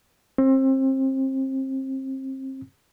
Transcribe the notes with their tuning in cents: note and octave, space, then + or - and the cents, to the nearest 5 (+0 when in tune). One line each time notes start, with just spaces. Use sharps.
C4 +30